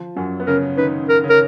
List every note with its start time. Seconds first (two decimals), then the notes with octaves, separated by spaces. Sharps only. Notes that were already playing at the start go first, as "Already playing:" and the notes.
Already playing: F3
0.16 F#2 F#3 C#4
0.40 B3
0.47 C#3 C#4 A#4
0.77 D#3 D#4 B4
1.09 A#4
1.24 C#3 C#4
1.30 A#4